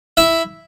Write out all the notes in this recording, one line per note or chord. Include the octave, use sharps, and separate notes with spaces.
E4 E5